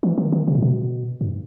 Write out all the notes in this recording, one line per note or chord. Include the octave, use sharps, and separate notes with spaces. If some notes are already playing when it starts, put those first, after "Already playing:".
E3
D#3
D#3
C3
A2
B2
G2